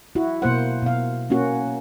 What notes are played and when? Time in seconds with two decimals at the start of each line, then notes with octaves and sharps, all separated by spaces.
0.15 E4 F#4
0.42 B2 A#3 C5 F#5
0.82 B2 F5
1.30 A#3 C#4 F#4